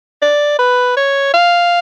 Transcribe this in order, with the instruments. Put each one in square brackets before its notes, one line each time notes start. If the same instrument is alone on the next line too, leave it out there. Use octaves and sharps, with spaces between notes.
[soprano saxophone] D5
B4
C#5
F5